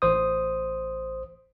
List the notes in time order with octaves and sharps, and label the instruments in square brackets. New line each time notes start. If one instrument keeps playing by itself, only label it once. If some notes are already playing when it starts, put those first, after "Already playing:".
[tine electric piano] A1 C5 D#6